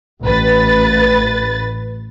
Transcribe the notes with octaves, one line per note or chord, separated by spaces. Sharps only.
A1 B4 A6